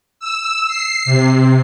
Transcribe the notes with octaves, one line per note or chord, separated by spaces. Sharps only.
E6
C7
C3